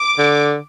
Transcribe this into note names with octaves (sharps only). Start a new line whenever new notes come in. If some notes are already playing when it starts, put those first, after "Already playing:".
Already playing: D6
D3